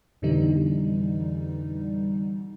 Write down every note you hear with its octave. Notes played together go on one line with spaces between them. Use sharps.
F2 B2 D3 E3 G3 D#4